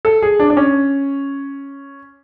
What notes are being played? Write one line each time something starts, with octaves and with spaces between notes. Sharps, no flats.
A4
G#4
D4
D4
C#4